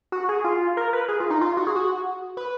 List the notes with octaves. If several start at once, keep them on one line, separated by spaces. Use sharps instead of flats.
F#4
G#4
F4
A#4
B4
G#4
F4
D#4
F4
F#4
G#4
F#4
B4